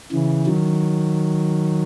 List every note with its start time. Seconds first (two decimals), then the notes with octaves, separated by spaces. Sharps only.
0.12 C#3 E3
0.46 D#3 F#3